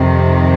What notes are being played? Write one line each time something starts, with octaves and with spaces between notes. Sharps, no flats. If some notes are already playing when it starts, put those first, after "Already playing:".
Already playing: F2 C3 D#3